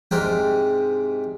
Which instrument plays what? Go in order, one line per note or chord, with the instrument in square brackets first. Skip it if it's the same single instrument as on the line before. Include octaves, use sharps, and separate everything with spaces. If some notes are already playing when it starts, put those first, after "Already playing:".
[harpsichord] G#2 C3 D4 A#4 G5